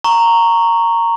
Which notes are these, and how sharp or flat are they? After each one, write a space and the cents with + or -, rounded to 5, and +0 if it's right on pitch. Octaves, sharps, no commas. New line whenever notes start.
A#5 -10 C#6 +0